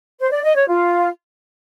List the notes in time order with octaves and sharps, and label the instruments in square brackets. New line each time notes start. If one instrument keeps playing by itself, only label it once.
[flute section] C5
D5
D#5
C#5
F4